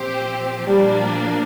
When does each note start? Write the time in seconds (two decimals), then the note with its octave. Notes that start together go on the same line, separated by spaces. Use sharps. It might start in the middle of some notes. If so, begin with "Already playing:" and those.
Already playing: A#2 F3 C4 G4 C5
0.68 A#2 F3 G3 A#3 D4